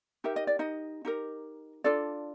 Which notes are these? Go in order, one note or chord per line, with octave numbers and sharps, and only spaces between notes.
D#4 G4 A#4 E5
D#5
D5
D#4 D#5
D#4 G4 A#4
D4 F4 A4 D5